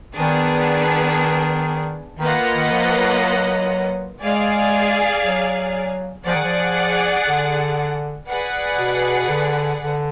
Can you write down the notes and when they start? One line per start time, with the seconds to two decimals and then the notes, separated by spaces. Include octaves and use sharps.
0.17 D#3 B3 D4 G#4
2.19 D#3 A#3 F4 B4 D#5 F#5
2.54 D#3
2.71 F3
2.96 F#3
4.23 G#3 G#4 D5 F5 G#5
5.24 F#3
6.25 F3 G#4 D5 F#5
6.35 D#3
6.44 F3
7.26 D3
8.28 G#4 B4 D5 F#5
8.78 B2
9.29 D3
9.80 D3